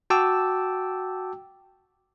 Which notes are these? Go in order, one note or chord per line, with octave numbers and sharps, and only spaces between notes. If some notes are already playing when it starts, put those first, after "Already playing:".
F#4 G5 A5 D6 E6